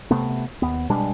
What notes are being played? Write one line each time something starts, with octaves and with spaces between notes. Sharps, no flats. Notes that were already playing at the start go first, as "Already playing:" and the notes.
C3 A3 B3
D#2 B3
B2 G3 G#3 D4